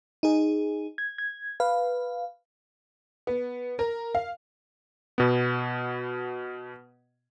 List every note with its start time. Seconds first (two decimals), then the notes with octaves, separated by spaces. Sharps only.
0.23 D#4 G#4
0.98 G#6
1.18 G#6
1.60 B4 F5
3.27 B3
3.79 A#4
4.15 F5
5.18 B2 B3